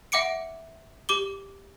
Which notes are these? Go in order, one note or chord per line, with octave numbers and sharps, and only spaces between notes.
E5 F#5 D6 C#7 D7
G4 D6 G7